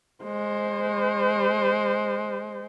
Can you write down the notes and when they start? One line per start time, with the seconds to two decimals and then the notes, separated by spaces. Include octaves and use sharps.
0.24 G#3 C5